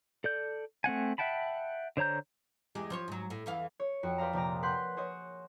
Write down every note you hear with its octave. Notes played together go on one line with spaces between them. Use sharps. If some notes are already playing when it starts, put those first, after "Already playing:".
A4 D5 G6
A3 C4 F#5 G#5
E5 F#5 G5 A5 B5
D3 C5 C#5 A#5 G6
E2 G#3 G4
F3 C5 C#5
G#2 F#3
A2
E2 E3 F5
C#5
F2 F#4 C#7
B4 C5 D5 F5 A#5
A#1 C3 D5 A#5
B4 F#5 C6 F#6 G6
G#4 C5 C#5 D#5